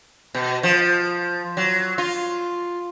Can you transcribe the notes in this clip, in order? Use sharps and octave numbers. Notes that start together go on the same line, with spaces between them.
B2
F3
F#3
F4